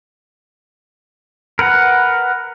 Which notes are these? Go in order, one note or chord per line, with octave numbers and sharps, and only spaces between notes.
A#4 B4 F#5